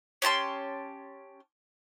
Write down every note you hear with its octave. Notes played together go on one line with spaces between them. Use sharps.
C#4 G4 A5 C6